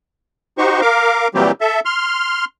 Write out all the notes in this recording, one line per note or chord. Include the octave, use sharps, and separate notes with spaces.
D#4 F#4 G4 C5 C#6
A#4 F5 D6
A#2 E3 F#3 G3 C4 G4
A4 E5
C6 F6